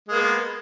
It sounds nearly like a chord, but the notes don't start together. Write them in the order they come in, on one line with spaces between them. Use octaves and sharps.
G#3 A#3 B3